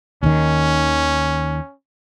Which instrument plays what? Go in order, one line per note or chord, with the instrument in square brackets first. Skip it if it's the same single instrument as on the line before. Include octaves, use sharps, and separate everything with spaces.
[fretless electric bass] D#2 D#3 [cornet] C#4